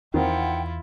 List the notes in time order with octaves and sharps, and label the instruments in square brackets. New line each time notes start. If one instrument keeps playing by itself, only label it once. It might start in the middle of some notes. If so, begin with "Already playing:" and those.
[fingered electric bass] E2 [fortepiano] D#3 C4 [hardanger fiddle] E4 F4 [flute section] F#5 G5